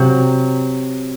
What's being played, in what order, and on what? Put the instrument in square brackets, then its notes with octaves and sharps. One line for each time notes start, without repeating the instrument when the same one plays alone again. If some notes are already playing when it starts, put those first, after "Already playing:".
Already playing: [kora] C3 F#3